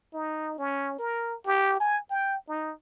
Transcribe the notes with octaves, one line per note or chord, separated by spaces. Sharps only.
D#4
C#4
A#4
G4
G#5
G5
D#4